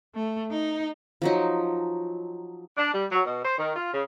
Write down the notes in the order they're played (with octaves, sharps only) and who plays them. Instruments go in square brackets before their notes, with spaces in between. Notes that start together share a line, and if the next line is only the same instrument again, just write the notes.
[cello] A3
D#4
[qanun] F3 F#3 D#4
[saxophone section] D4
G3
F#3
B2
C5
D#3
F4
C#3